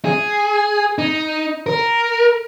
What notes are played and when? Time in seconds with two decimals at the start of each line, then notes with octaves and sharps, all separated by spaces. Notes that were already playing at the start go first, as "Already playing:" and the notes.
0.05 G#4
0.98 D#4
1.66 A#4